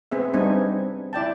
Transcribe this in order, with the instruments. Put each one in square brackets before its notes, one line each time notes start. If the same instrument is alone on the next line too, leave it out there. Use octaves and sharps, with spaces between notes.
[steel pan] B3 C4 G#4 E5
G3 B3 C4 D4 D#4 G#5
E4 D5 G5 A5